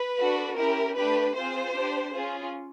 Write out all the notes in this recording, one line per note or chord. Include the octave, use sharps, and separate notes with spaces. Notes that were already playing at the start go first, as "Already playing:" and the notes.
Already playing: B4
D4 F#4 A4
C#4 E4 G4 A#4
A3 D4 G4 B4
C4 F4 G#4 C5
D4 G4
C#4 F4 G#4